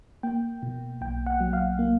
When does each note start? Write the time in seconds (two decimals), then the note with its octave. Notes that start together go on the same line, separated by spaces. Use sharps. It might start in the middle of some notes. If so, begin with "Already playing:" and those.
0.23 A#3 G5
0.63 B2
1.01 B1 G5
1.26 F#5
1.40 F#3
1.53 F5
1.79 A#3